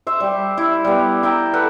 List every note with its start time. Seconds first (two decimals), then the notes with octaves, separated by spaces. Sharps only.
0.07 C5 E5
0.20 G3 G4
0.58 E4 E5
0.84 G3 B3
1.23 E4 E5 G5 A#5
1.53 A4 B4 F#5